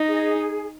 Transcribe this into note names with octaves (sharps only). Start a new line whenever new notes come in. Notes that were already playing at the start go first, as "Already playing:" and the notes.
Already playing: D#4 D#5
G#4